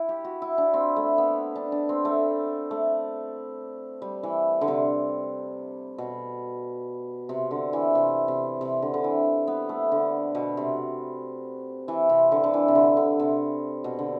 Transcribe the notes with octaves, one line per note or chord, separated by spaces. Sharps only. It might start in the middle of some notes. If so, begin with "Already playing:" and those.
Already playing: E4
G4
F#4
E4
D4
C4
A3
B3
D4
D4
C4
A3
A3
G3
E3
D3
C3
B2
C3
D3
E3
C3
C3
C3
D3
D3
E3
B3
A3
D3
B2
C3
E3
C3
D3
D3
E3
C3
D3
D3
C3
B2
D3